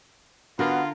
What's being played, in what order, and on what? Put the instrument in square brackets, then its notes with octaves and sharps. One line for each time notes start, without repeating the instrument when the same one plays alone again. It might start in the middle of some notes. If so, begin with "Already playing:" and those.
[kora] D3 A#4 F#5 [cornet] B3 [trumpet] F4 [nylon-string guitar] F#4